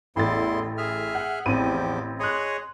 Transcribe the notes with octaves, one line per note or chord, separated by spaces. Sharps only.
A1 E2 A2 E4 C6 A6
G#4 E5 F6
F#5
A1 E2 F3 C4 G4 D#7
G#4 C#5 D#5 C6 F#6